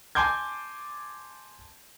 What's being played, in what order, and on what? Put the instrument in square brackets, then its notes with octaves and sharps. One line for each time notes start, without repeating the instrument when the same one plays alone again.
[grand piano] G#5 A5 C6 D6 G6 G#6